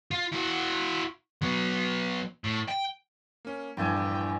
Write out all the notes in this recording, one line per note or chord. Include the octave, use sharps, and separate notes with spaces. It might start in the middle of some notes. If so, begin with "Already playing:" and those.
F4
E4 F#4
F#3 B3
A2
G5
A#3 C#4
A#1 E2 G2 E4 D5 G5 G#5